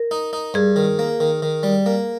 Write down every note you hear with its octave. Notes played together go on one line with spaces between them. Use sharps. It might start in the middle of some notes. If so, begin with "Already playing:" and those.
Already playing: A#4
D#4
D#4
G2 G#4
D#3
A#3
D#3
D#3
G3
A#3